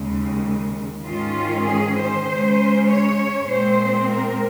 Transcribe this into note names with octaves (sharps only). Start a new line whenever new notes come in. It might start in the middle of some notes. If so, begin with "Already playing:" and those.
Already playing: D#2 C#3 G#3
G#2 D#3 G#3 C#4 F4
G#4
C5
C#3 G#3 C#4
C#5
A#2 G#3 C4 C5
A#4